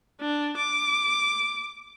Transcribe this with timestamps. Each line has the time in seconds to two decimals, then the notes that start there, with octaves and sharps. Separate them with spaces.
0.21 D4
0.57 D6